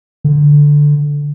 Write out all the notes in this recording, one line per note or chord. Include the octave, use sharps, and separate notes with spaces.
D3